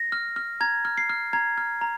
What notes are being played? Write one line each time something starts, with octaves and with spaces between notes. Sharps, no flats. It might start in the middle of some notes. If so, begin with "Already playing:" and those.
Already playing: A#6
F6
F6
A#5 G#6
F6
C7
F6
A#5 G#6
F6
A#5